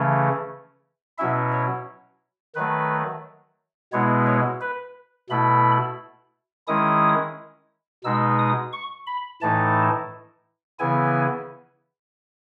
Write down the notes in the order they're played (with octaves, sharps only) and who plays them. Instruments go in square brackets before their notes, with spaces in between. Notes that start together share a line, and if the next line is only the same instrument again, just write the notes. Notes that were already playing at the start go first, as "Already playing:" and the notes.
Already playing: [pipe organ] C#3 E3 A3 C#4
B2 F#3 C#4 E4 E5
C#5
D#3 F#3 A3 B4
B2 G#3 B3 E4 C#5
C#5
B4
B2 A3 E4 B5
D#3 G#3 C#4 E4 D#6
B2 G#3 D#4 E6
D#6
C#6
B5
A2 E3 A3 D#4 A5
C#3 E3 B3 E4 G#5